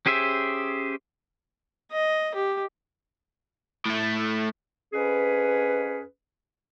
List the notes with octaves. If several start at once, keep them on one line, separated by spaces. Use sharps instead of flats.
C#4 G4 G#4 C5 E5
D#5
G4
A2 A3
F2 C#4 G#4 B4